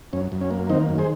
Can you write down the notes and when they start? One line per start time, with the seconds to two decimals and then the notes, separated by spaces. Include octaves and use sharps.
0.13 F#2 C#4
0.32 F#2
0.41 C#4
0.51 A#3
0.69 D#3 C4 D#4
0.89 F#2
0.98 G#4 C5